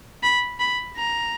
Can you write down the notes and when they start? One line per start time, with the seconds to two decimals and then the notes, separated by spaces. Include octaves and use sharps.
0.23 B5
0.60 B5
0.97 A#5